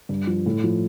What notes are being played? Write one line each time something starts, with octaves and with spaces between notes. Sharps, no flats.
G2
F3
A2
F3